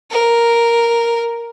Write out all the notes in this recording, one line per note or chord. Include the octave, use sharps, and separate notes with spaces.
A#4